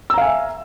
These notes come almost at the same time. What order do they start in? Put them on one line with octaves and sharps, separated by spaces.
E6 A#5 F5 G#5 E5